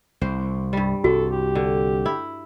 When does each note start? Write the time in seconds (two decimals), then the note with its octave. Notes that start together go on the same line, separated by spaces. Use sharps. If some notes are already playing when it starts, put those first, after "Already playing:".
0.21 C2 C5
0.73 G2 G3
1.04 C2 F#4 A4
1.32 G4
1.55 D3
2.06 E4